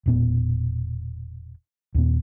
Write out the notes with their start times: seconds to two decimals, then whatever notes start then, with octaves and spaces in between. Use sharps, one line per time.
0.06 E1 A#2 B3
1.95 D#2 A#2 B3